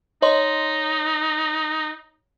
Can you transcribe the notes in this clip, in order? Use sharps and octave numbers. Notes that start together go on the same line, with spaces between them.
D#4 C#5 D#5 C6